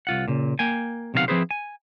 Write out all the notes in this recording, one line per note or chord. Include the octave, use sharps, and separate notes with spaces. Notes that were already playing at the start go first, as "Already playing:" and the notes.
C2 F4 F#5
A#2 C#3
A#3 G5 G#5
B1 C3 D#3 D#4 F5 F#5
F3 C4 E4 G#4 B4 C5
G#5